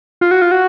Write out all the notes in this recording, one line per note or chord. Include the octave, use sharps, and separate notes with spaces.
F4
F#4
F4
F#4